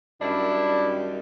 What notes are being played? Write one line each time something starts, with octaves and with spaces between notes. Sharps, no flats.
F#2 D#3 G3 D4 E4